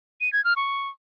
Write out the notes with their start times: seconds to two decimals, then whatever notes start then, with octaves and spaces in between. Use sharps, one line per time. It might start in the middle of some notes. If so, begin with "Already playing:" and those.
0.21 D#7
0.33 G#6
0.45 F6
0.56 C#6